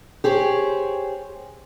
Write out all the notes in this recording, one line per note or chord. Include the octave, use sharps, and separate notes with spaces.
G4 G#4 C5 C#5